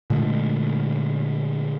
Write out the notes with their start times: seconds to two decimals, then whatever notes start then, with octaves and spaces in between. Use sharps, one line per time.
0.10 A#2 D3 G#3 A3